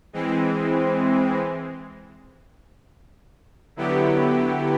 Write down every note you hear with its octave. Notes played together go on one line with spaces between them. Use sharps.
E3 G#3 C4
D3 F#3 B3 E4 G4